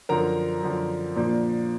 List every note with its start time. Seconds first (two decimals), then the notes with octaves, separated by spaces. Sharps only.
0.09 F#2 D3 F3 A#4 A#5
0.63 F#2 D3 F3
1.16 A#2 F3 A#3 D4